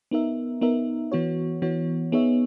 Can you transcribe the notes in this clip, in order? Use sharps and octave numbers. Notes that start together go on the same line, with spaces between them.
B3 D#4 A#4 E5
B3 D#4 A#4 E5
E3 B3 F#4 C#5
E3 B3 F#4 C#5
B3 D#4 G#4 C#5 E5